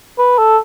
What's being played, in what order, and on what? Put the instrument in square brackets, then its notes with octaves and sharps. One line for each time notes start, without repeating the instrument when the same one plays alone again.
[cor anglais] B4
A4